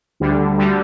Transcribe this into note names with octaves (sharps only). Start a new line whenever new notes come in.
D2 D3 G3
D2 D3 G3